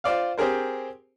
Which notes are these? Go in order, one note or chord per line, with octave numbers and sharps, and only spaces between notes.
F4 C5 D5 F5
C4 G4 G#4 A#4 C5